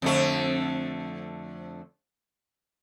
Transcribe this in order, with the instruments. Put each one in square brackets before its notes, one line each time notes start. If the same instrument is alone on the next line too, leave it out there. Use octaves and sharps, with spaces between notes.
[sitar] F2 D3 A3